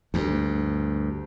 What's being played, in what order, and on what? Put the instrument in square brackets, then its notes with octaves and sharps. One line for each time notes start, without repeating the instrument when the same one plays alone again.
[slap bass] D2 G2